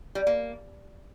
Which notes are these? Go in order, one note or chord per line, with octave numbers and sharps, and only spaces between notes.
G3
A#3